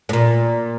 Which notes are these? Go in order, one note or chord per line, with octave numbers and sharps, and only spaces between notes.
A2
A#2